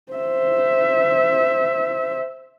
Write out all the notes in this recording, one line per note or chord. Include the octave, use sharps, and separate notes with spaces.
C5 E5